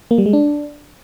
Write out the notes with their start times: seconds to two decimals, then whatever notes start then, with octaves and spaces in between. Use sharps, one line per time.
0.11 A#3
0.18 G3
0.26 G#3
0.33 D4